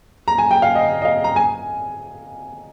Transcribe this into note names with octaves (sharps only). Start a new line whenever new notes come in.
A#5
G#5
G5
F5
D#5
D#5
F5
A#5
G#5